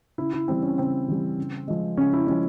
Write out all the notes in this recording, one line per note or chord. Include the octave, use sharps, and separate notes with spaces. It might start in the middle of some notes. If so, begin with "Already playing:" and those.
C#3 E4
E4
E3 G3 C4
C#4
C#3 C4
E3 G3
C#3
F3 G#3
C#3 C#4
E4
F3 G#3 C#4